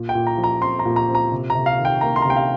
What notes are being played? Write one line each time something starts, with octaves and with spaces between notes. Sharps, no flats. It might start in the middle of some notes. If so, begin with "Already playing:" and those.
Already playing: A#2
G5
A#2
A#5
F3
A#5
C4 C6
A#5
A#2
A#5
C4
A#5
C3
A#5
C3
F5
D#3
G5
A#3 A#5
C6
A#5
C3 G5
F5